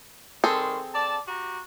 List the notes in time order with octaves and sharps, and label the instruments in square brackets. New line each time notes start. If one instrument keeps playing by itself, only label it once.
[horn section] D#3 G3 C6 [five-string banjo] C4 G#4 A4
[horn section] D5 A5
F#4 G4 A#5